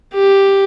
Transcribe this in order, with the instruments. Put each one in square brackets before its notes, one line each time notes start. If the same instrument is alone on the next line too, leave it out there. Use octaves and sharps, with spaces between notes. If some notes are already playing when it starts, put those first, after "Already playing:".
[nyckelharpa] G4